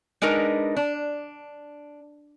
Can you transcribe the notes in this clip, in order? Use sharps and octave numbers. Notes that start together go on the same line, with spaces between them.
G#3 D4 D#4 A#4 B4
D4